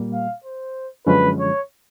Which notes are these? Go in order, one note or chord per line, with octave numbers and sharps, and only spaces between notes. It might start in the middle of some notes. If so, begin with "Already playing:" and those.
Already playing: A#2 G3 A#3
F5
C5
F#2 D3 F3 G#3 C#4 B4
C#5